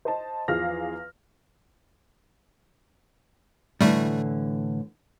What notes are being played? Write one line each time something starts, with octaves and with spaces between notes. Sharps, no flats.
C5 D#5 A5
E2 F3 G#4 F5 F6 A#6
A2 D3 E3 G3 A3